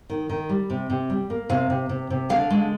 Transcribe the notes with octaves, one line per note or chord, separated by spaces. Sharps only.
D#3
D#3
G3
C3
C3
G3
A#3
C3 F5
C3
C3
C3
D3 F5
G#3